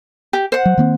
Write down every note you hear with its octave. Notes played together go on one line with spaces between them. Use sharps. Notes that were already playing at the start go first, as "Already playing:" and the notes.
G4
C5 F#5
F#3
D#3 A#3 C4